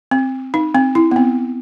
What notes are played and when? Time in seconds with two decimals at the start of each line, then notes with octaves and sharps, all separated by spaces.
0.11 C4
0.54 D#4
0.75 C4
0.95 E4
1.11 B3
1.16 C4